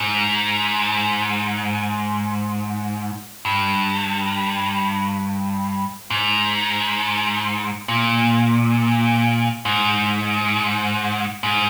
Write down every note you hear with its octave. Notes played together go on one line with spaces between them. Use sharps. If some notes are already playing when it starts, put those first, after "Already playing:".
Already playing: G#2
G2
G#2
A#2
G#2
G#2